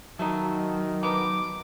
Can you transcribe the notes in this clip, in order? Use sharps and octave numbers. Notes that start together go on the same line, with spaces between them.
D#3 F#3 A3 D#4
B3 D4 D#4 D6